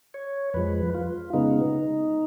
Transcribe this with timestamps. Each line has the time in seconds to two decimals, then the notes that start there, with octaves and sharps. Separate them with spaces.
0.14 C#5
0.54 F2 F3 G#3 B4
0.94 F4
1.33 C#3 G#3 B3 D#4